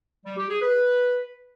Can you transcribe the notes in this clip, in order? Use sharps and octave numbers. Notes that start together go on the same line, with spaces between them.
G3
G4
G#4
B4